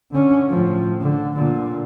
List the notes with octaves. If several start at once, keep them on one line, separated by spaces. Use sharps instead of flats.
D3 C#4
A2 F3
D3
A#2 D3